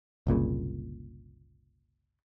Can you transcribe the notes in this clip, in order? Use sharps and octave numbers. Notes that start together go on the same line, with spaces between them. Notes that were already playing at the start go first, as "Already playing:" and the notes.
F#1 C2 A#2 C#3